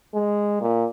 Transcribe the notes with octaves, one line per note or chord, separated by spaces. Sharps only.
G#3
A#2